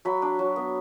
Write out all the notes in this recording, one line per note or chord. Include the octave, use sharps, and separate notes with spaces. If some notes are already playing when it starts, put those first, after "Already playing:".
F#3 B5
D4
F#3
B3